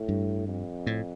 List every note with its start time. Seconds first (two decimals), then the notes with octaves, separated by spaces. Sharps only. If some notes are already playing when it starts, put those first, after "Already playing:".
Already playing: A2
0.09 G2
0.48 F2
0.87 A2